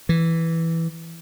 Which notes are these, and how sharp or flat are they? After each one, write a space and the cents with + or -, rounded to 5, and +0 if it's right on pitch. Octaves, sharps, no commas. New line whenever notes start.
E3 +0